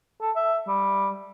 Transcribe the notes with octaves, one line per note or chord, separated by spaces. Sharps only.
A4
E5
G3